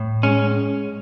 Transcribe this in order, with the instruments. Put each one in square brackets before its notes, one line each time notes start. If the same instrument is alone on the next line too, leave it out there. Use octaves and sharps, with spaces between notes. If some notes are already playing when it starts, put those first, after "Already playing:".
Already playing: [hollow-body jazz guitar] A2
[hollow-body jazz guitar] G#3 [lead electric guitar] C#4